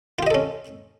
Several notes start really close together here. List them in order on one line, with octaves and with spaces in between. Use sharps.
F4 G4 D#5 A4 C#4